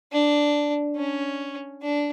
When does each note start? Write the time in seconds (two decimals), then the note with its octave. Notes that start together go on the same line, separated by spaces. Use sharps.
0.12 D4
0.96 C#4
1.82 D4